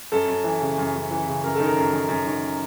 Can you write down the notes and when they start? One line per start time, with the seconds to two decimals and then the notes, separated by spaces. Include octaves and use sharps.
0.12 F#2 A4
0.28 F#2
0.44 E3
0.60 C#3
0.78 F#2
0.94 F#2
1.11 E3
1.27 C#3
1.44 F#2 A#4
1.55 D#3 A4
1.66 A#4
1.77 F#2
1.93 D#3
2.09 F#2
2.26 D#3